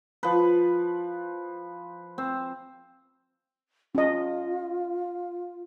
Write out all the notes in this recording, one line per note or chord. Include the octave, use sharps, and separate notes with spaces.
F3 B4
C4
C#4 F4 D#5